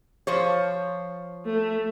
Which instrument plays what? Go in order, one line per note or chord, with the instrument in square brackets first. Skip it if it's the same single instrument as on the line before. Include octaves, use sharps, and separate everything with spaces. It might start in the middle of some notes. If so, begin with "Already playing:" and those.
[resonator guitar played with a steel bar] F3 C5 C#5
[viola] A3